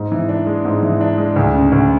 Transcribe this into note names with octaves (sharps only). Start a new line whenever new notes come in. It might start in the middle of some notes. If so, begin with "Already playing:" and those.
Already playing: G#2
E3
D4
G#3
G#2
E3
D4
G#3
D2
C#3
D2